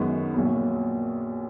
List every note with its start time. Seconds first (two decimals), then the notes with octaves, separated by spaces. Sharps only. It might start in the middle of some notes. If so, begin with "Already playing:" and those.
Already playing: F#2 D#3 G#3 B3 C#6
0.34 A#1 A#2 F#3 B3